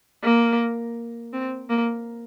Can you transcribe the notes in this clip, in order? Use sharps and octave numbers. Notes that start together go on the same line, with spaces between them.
A#3
C4
A#3